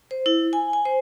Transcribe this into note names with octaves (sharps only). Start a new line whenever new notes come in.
C5
E4
G#5
G#5
C5